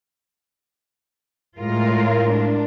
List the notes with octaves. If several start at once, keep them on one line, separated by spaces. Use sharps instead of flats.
A2 G#3 F4 A#4
D4